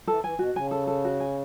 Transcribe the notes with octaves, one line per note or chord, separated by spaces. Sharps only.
E3 A4
E3 G#5
B2 F#4
C#3 G#5
A4
A4
F#4
G#5